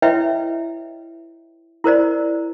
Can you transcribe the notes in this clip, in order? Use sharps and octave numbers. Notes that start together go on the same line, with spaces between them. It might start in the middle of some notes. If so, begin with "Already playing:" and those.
E4 B4 C#5 D#5 E5 G5
E4 A#4 C5 D5